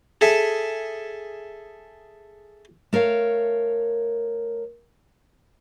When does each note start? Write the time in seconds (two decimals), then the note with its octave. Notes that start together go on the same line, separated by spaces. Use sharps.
0.21 G#4 A4 E5
2.93 A3 A#4 C#5 F5